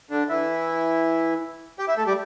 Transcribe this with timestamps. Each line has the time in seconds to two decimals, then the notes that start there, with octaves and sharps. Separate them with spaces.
0.10 D3 D4
0.29 E3 E4
1.79 G4 G5
1.88 E4 E5
1.97 A3 A4
2.07 G3 G4